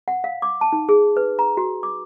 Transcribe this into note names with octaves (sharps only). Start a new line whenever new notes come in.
F#5
F5
D6
A5
D#4
G#4
B4
A#5
F#4
D6